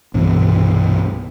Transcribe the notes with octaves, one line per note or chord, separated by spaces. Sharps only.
C2 G2 B2 E3